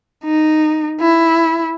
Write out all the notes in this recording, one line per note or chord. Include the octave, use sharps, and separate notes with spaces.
D#4
E4